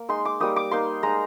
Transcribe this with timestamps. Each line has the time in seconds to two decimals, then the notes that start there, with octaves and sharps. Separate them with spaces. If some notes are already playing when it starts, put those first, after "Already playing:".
Already playing: A#3
0.09 G#3 D#4 C6
0.25 D6
0.40 G3 A#3 D#4 D#6
0.56 D6
0.71 A#3 D#4 C6
1.03 G#3 D#4 A#5